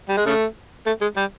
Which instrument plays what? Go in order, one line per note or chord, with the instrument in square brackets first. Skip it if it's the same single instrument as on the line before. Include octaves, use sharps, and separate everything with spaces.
[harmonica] G3
G#3
C#3 A3
A3
G#3
G3